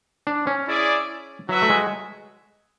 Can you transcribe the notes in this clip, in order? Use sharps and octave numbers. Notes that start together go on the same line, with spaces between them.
D4
C#4
E4 G#4 D5
F#3 F#4 B4 E5
A3
G#3